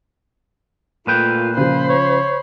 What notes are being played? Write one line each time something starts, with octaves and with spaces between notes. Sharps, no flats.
A#2 A3 F4 B4 G5
C#3 F3 C5 B5
C#5